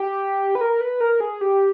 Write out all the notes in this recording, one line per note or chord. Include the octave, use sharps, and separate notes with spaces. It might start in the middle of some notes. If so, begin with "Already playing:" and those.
Already playing: G4
B4
A#4
B4
A#4
G#4
G4